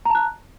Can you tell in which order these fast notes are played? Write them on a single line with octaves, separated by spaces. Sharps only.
A#5 A5 F#6